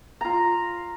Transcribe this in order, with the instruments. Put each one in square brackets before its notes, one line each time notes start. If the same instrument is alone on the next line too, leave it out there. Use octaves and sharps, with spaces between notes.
[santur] F4 A#5